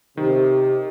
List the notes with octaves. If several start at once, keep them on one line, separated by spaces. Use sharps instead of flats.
C3 D#3 G4